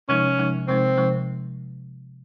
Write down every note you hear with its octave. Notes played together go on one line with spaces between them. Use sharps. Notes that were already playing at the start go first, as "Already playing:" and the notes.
C3 F3 G#3 C#4 D#4
C3 F3 G#3 D#4
C3 F3 G#3 C4 D#4
C3 F3 G#3 D#4